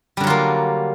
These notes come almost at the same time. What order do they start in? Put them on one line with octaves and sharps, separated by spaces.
G3 D3 F#3 F4 A#3